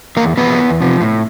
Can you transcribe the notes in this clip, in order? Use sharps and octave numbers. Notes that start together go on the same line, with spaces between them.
E2 A#3 A#4
C3 F3 B3 B4
E2
C3 F3
A2